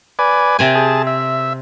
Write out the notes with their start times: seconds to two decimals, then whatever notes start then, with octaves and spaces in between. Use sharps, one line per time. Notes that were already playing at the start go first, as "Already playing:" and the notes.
0.19 B4 D5 G#5
0.59 C3 C4 G#5
0.75 G#4 A5
1.07 E5